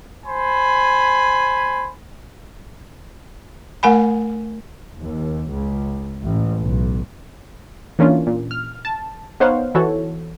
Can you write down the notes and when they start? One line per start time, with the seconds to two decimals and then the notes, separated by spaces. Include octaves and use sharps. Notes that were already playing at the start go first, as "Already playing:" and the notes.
0.26 C5 G#5 B5
3.83 A3 A#4 F#5 G#5 B5
5.01 D#2
5.52 C#2
6.22 A1
6.61 B1
7.99 E3 A#3 C#4 D4 F4
8.27 A#2
8.51 F6
8.85 A5
9.40 B3 D#4 C5 C#5 F5 F#5
9.75 E3 F#4 A4 C#5